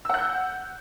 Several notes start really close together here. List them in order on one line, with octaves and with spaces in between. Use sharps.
E6 F#5 F#6 G6